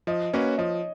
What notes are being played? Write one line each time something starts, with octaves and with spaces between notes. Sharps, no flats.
F3 D#5
A#3 C#4 F#4 B4 C#5
F3 D#5